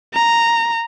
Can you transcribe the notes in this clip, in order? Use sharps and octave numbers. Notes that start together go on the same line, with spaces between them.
A#5